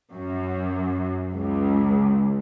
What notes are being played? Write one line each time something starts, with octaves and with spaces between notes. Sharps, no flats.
F#2
C#2